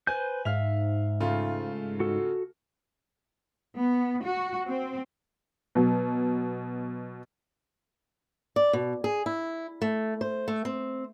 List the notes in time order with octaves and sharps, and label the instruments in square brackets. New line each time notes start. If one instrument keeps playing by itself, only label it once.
[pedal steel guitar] B4 C5 G6 [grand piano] G#5
[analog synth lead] G#2 [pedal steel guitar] E5 [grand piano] F5 F6 F7
[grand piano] C#3 A3 F4
[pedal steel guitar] F#4 A4
[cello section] B3
F#4
C4
[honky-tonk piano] B2 F#3
[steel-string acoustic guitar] D5
B2
G#4
E4
A3
C5
A3
C4